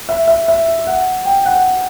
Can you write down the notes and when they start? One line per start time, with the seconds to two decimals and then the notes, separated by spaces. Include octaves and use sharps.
0.09 E5
0.28 E5
0.48 E5
0.87 F#5
1.25 G5
1.46 F#5